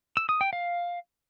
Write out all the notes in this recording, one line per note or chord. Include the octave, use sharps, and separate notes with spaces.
E6
D#6
G5
F5